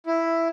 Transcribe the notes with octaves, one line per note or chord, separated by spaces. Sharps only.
E4